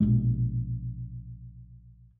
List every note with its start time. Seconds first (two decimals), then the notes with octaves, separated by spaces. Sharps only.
0.01 A#1 B2 G#3